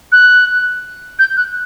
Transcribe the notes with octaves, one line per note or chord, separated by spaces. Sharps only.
F#6
G6
F#6